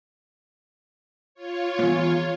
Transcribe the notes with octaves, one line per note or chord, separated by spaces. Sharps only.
F4 C#5
E2 G#2